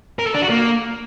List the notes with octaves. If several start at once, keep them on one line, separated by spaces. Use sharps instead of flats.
A#4
A4
D4
F#4
A#3